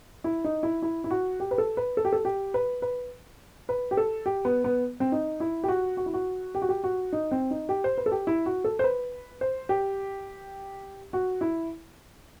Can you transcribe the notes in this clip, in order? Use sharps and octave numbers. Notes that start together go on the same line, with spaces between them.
E4
D#4
E4
E4
E4
F#4
G4
B4
A4
B4
A4
G4
A4
G4
B4
B4
B4
G4
A4
G4
B3
B3
C4
D#4
E4
G4
F#4
F#4
E4
F#4
G4
F#4
G4
F#4
D#4
C4
D#4
G4
C5
B4
A4
G4
E4
F#4
A4
C5
B4
C5
G4
F#4
E4